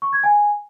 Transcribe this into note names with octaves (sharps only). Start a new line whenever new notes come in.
C#6
G#6
G#5